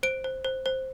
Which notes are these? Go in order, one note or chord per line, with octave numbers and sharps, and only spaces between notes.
C5 D7
C5
C5
C5